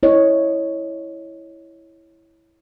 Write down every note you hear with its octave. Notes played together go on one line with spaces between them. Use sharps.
E4 C#5 D#5